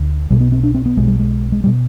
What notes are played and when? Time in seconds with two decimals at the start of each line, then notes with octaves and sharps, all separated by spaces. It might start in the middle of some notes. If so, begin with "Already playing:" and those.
Already playing: D2 D3
0.30 B1 B2 G3
0.41 B3
0.52 C4
0.63 D4
0.75 C4
0.86 B3
0.97 B1 B2 G#3
1.08 G3
1.19 G#3
1.52 G#3
1.64 G3
1.67 B2